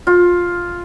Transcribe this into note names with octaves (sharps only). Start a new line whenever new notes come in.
F4